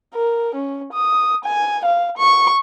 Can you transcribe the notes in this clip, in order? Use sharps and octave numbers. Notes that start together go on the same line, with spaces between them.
A#4
C#4
D#6
G#5
F5
C#6